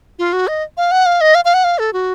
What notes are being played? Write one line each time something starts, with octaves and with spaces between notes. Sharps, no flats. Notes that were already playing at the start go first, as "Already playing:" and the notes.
F4
F#4
D#5
F5
F#5
F5
D#5
F5
F5
F#5
F5
A4
F#4